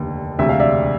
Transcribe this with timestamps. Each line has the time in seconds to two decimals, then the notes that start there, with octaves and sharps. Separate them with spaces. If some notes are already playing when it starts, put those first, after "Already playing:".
Already playing: F1 D#2 D3
0.38 E1 D2 C3 E5
0.49 F5
0.60 D5 E5